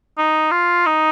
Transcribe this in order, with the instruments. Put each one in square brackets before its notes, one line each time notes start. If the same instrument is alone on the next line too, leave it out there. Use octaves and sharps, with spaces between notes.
[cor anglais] D#4
F4
D#4